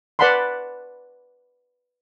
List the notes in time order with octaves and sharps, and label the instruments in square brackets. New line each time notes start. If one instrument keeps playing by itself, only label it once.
[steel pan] B4 D5 F#5 A5 B5 C6